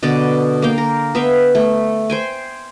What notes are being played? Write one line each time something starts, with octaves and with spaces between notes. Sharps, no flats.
B2 D3 B3 D5
A#3 F5 G5
A#4
B3 E5 F5 G5
A3
C5 G5 G#5